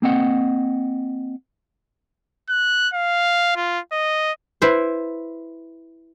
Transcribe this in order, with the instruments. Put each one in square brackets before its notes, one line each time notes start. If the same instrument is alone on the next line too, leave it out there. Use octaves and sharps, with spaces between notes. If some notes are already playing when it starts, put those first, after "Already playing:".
[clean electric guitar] A#3 C4 D#5 F#5
[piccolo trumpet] F#6
F5
F4
D#5
[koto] E4 B4 C5